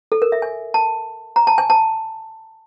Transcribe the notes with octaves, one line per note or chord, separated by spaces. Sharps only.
A4
A#4
E5
G#5
A5
A#5
A5
G#5
A5